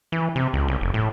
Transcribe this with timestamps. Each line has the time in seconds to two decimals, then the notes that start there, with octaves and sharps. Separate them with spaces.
0.12 E3
0.36 C3
0.54 C#2
0.68 C2
0.81 F1
0.94 A2